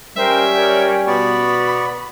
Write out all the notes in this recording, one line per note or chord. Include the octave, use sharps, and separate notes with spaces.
G3 C#4 A#4 C5 E5 G5
A#4 C#5 D5 G5
B2 B3 D5 B5 C#6